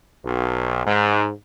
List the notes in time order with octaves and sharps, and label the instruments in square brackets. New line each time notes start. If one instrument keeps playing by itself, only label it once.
[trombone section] B1
G#2